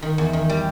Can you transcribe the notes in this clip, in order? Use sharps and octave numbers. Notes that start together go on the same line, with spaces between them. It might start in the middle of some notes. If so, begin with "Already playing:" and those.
D#3
E2
D#3
G3